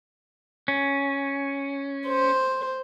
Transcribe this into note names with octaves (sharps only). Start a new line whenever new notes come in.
C#4
C5